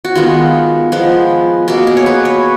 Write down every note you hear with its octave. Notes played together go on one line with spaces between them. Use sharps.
F#4
D#3 G#3 B3 F4
F3 G#3 B3
B2 A#3 F#4
G#4
C#5
B4
C#5